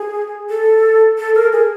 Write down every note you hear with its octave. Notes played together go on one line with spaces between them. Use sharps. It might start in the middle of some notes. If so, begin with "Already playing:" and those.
Already playing: G#4
A4
A4
A#4
G#4